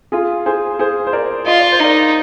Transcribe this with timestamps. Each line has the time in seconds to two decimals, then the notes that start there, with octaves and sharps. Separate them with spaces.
0.12 F4 G#4
0.46 G#4 C5
0.79 G#4 C5
1.07 C5
1.13 A#4 D5
1.47 F4 D#5
1.59 D5
1.72 C5
1.80 D#4 A#4 D5